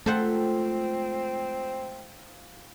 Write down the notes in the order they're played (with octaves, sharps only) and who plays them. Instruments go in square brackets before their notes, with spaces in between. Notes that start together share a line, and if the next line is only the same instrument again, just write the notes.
[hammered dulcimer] G#2 F3 G5 [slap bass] A3 [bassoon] C4 [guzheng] A4 C5 F#5